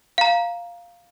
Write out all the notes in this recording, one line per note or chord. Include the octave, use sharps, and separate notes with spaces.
F5 A#5